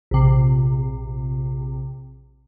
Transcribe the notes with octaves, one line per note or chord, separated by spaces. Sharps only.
A#1 C3